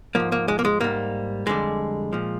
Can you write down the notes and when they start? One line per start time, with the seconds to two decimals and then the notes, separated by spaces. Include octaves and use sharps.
0.15 G#2 F3 A#3
0.32 A#3
0.48 G#3
0.59 A#3
0.65 G#3
0.80 G#2 G3 A#3
1.46 F2 D3 G3 G#3
2.13 A#2 F3